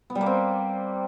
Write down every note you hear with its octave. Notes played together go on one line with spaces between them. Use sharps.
B3
G3
A#3
C4